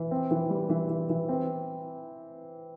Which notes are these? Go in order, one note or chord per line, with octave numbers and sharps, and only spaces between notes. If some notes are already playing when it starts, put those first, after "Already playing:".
Already playing: E3
C4
E3
G3
E3
E3
E3
C4